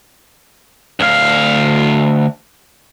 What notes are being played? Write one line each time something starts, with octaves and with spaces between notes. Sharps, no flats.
D2 F5